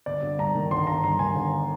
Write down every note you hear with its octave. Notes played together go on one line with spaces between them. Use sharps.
G1 D5
G1
G2 A#5
D#3
G1 C6
G1 A#5
G2 A#5
D#3 G#5
G1